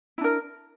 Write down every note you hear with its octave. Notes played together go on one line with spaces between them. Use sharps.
D4 E4 A#4